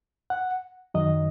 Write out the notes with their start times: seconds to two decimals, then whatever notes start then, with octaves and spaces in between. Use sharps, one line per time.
0.30 F#5
0.94 F#2 D#3 F#3 D#5